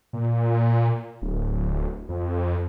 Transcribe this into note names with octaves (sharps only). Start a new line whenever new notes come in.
A#2
D1
F2